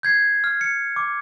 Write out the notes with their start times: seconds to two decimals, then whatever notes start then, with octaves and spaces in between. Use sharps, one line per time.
0.03 G6 G#6 C7
0.44 F6
0.61 C#7
0.96 D6